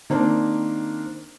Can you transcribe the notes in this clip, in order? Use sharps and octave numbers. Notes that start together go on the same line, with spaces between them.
D#3 A#3 C4 D4 D#4